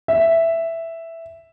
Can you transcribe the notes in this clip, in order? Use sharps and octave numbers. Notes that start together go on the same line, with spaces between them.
E5